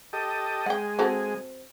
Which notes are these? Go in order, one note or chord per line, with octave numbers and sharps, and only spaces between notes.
G4 A4 D#5
G#3 F#5 G5
C4 F#4 A4